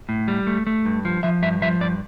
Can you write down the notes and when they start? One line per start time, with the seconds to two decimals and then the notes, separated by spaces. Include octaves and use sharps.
0.09 A2
0.28 G3
0.47 A3
0.67 A3
0.86 G2
1.05 F3
1.23 F3 E5
1.42 G2 E5
1.62 F3 E5
1.81 G2 D5